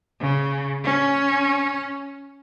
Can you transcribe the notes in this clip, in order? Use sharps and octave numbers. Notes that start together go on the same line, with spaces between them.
C#3
C#4